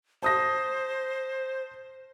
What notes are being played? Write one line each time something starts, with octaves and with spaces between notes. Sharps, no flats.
C5 A5 D#6 A#6